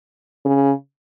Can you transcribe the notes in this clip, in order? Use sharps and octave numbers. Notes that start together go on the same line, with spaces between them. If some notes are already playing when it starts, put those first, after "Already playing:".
C#3